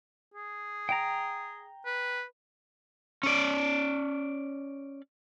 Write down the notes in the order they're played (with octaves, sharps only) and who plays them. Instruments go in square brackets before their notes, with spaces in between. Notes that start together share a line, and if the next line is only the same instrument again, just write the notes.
[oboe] G#4
[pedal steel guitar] G5 A#5
[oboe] B4
[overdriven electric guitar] C#4 D5